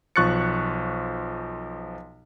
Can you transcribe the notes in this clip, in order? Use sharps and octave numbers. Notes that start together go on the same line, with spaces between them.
B1 F3 C#6 F#6 A6 C#7